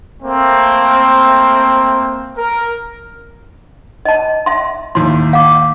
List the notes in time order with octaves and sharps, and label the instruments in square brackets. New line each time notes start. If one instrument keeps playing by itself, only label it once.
[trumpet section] A3 A#3 C4
A#4
[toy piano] D#5 A5
E5 C6
[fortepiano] D#2 A2 [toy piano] C6
[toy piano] F5 D6